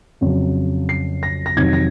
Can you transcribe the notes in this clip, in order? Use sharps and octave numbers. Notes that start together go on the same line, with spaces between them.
F2 C#3 F#3
C7
A#6
A#6
F2 C3 D#3 F#3 G#6
A#6